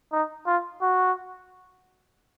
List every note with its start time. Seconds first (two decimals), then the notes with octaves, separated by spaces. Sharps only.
0.12 D#4
0.46 F4
0.82 F#4